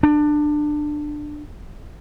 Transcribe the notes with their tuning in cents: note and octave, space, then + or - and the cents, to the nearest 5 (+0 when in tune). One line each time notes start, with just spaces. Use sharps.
D4 +20